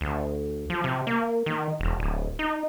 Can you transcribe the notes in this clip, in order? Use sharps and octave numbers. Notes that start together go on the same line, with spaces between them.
D2
F3
C3
A#3
D#3
E1
D1
D#4